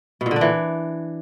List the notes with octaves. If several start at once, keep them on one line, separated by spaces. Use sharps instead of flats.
B2
A#2
D3
D4
E3